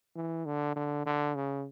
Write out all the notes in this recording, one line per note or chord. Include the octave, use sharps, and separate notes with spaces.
E3
D3
D3
D3
C#3